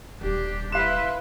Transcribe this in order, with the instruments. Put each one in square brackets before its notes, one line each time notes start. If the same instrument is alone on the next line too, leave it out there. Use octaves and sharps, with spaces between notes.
[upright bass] D#1 G3 [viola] D4 G4
[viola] E4 B4 [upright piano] F5 E7 [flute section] C6 F#6